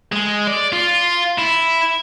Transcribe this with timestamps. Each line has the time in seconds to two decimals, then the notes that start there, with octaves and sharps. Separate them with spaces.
0.12 G#3
0.48 D5
0.73 F4
1.38 E4